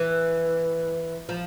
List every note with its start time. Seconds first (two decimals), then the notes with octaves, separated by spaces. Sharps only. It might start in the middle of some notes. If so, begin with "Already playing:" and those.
Already playing: E3
1.29 F3